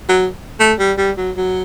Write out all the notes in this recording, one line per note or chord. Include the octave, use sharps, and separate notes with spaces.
F#3
A3
G3
G3
F#3
F#3